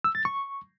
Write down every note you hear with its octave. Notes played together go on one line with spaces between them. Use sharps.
E6
A6
C#6